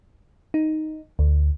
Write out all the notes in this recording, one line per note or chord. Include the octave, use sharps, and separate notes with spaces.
D#4
D2